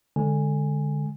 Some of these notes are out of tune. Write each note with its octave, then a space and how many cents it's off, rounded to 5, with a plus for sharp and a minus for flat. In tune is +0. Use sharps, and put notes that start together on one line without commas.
D3 +0 G#3 +0 G#5 -10